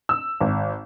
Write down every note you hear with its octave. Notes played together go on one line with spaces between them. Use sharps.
E6
G#1